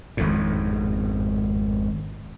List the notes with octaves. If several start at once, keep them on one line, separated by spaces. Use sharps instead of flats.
G#1 F2 A2